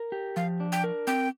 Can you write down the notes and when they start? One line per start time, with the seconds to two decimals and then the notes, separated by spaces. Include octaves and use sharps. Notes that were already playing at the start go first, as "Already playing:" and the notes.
Already playing: A#4
0.12 G4
0.36 F3 F5
0.60 D4
0.72 G5
0.84 A#4
1.07 C4 G5